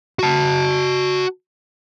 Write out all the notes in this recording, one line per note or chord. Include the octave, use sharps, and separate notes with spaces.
F#4 A5